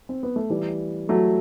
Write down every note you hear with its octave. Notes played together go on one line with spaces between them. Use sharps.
C4
B3
A3
E3 G3
F#3 A3